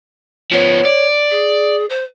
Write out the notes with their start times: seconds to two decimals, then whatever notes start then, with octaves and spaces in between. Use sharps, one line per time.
0.52 F3 B3 C#5
0.85 D5
1.30 G#4
1.89 C5